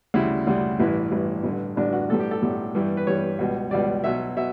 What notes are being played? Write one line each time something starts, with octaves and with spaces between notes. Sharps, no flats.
D2 C#3 G3 E4
D2 C#3 G3
A1 G2 E3 E4
A1 G2 E3
A1 G2 D3
A1 G2 D3 D4
F#4
B1 A2 G3 A4
G4
A4
B1 A2 G3
G2 E3 G3
B4
G2 E3 G3 C#5
C#2 B2 G3
C#2 B2 G3 D5
B1 B2 F#3 E5
B2 E5